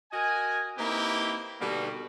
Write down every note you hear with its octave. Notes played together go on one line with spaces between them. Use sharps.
F#4 A#4 D#5 G#5
A#3 C4 D#4 E4 G4 B4
B2 D3 G3 A#3 D#4 F#4